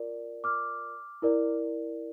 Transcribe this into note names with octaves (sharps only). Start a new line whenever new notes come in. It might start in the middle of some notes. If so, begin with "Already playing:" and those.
Already playing: F4 A#4 D5
D6 F6
E4 A#4 D5